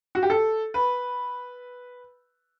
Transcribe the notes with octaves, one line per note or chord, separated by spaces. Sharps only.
F#4
G4
A4
B4